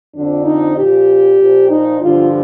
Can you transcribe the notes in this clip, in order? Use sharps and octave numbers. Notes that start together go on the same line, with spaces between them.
F2 D3 F3 D4
D#4
A#2 F3 G4
A#2 F3
D#4
G2 D3 F3 F4